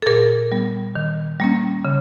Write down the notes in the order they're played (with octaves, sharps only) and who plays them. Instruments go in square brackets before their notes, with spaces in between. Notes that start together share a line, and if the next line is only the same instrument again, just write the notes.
[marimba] A4
A#2 G#4 A#4
G3 B3
D#3
G3 A#3 C#4
C#3